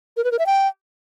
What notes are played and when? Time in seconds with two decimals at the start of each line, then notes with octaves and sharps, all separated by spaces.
0.17 A#4
0.24 B4
0.32 A#4
0.39 E5
0.46 G5